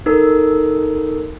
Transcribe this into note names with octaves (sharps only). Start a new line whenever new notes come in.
D#4 A4 A#4